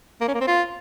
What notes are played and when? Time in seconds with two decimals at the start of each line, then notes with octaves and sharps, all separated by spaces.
0.21 A#3
0.28 C#4
0.34 A#3
0.41 C4
0.47 F4